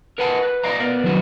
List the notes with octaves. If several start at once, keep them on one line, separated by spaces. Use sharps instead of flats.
A#4 B4 F#5 G#5 A5
B4
D5 D#5 F5 A#5
B3 A#4 D5
D#3 F#3 G3 D4 F#4 B4